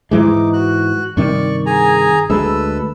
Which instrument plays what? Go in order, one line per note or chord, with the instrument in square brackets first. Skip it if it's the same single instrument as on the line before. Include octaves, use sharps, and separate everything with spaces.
[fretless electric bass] G#2 E3 G#3 [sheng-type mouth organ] D#4 D6
[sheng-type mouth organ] F#4 F#6
[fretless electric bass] G2 C3 D#3 [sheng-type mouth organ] D5 C#6
[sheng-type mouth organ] G#4 G#5 A#5
[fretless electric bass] D2 G#3 [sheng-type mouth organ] A4 B4 E6